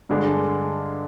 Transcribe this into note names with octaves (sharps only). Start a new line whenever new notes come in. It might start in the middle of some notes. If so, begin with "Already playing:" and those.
G2 D3 G#3 D4